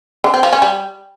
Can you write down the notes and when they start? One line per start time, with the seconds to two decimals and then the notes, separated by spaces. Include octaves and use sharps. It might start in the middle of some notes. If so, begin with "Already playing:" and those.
0.24 D3
0.34 C4
0.43 F3
0.53 C#4
0.62 G3